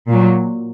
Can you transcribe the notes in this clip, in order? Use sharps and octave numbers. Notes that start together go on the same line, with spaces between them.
A#2 F#3